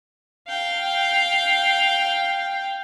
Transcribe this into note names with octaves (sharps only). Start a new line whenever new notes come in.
F5 G5